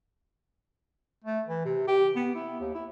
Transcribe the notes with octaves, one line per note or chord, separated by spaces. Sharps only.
A3
E3
C3
G4
B3
E4
D#2
E4